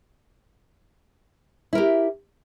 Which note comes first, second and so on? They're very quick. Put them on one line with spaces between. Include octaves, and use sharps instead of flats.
E4 A#4 G4